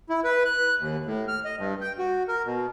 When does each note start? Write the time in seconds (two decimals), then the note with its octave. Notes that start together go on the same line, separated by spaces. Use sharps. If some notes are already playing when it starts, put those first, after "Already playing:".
0.09 E4
0.24 B4
0.45 F#6
0.80 D#2
1.06 A2
1.28 F6
1.45 D#5
1.58 G2
1.81 G5
1.98 F#4
2.28 A#4
2.45 B2